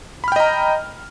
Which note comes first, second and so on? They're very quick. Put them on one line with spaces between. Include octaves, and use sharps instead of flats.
B5 F6 G5 D#5 A#5